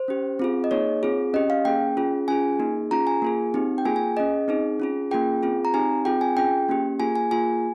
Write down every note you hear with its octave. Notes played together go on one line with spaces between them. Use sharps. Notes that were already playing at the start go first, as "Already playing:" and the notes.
Already playing: C5
C#4 G4
C4 F4 G#4
D#5
A#3 D#4 G#4 C#5
C4 F4 G#4
C#4 G4 D#5
F5
A#3 C#4 G#4 G5
C#4 F4 G#4
C#4 F4 G#4 G#5
A#3 D#4 G#4
C#4 F4 G#4 A#5
G#5
A#3 F4 G#4
C4 D#4 G4
G5
A#3 F4 G#4 G#5
G#5
C#4 G#4 D#5
C4 D#4 G#4
C#4 F4 G#4
A#3 C#4 F4 G#4 G5
C4 F4 G#4
A#5
C4 D#4 G4 G#5
C4 F4 G#4 G5
G#5
C#4 F4 G#4 G5
A#3 C#4 G4
A#3 F4 G#4 G#5
G#5
A#3 F4 G#4 G#5